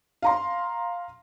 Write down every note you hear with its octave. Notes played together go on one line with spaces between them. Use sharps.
F5 A#5 C6